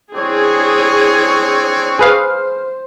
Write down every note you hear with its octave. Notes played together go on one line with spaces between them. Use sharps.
C4 D4 E4 G#4 C#5 C#6
G#4 B4 C5 F5